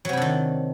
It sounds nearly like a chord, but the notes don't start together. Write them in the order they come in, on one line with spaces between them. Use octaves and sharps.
F#3 C3 E4 D4 D#3